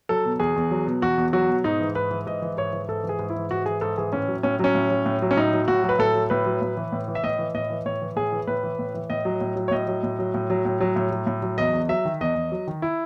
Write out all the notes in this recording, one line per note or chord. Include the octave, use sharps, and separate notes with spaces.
F#3 A4
B2
E2 G#4
E2
F#3
B2
E2 F#4
E2
F#3 F#4
B2
G#2 D#4
E3
G#2 B4
E3
G#2 D#5
E3
G#2 C#5
E3
G#2 A4
E3
G#4
G#2
E4
E3
G#2 F#4
E3 G#4
G#2 A4
E3 G#4
A2 C#4
F#3
A2 C#4
F#3 C#4
A2
F#3
A2
F#3
C#4
A2 D#4
F#3
A2 F#4
F#3
B4
A2 A4
F#3
A2 B4
F#3
A2
E3
A2
E3
E5
A2 D#5
E3
A2 D#5
E3
A2 C#5
E3
A2 G#4
E3
A2 B4
E3
A2
E3
A2 D#5
F#3
A2
F#3
C#5
A2 D#5
F#3
A2
F#3
A2
F#3
A2
F#3
A2
F#3
A2
F#3
E2 D#5
E2
F#3 E5
D#3
E2 D#5
E2
F#3
D#3
E4